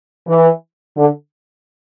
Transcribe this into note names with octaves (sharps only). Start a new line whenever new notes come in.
E3
D3